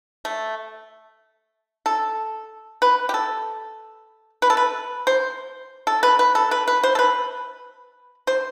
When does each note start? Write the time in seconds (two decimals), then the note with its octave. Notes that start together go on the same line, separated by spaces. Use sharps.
0.25 A3
1.86 A4
2.82 B4
3.09 G4
3.14 A4
4.42 B4
4.50 A4
4.57 B4
5.07 C5
5.87 A4
6.03 B4
6.19 B4
6.35 A4
6.51 B4
6.68 B4
6.83 C5
6.95 A4
6.99 B4
8.27 C5